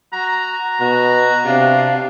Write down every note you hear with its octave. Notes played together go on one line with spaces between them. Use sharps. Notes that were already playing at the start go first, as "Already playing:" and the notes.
F#4 A#5
B2 F#4
C3 D4 F5